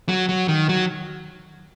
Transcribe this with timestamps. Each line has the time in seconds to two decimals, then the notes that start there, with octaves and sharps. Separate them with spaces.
0.09 F#3
0.29 F#3
0.48 D#3
0.69 F#3